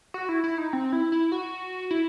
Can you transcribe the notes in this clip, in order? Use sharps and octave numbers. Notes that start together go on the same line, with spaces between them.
F#4
E4
E4
D#4
C4
E4
E4
F#4
E4